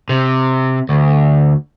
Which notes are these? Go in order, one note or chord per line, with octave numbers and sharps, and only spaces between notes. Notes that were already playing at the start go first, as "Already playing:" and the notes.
C3
D2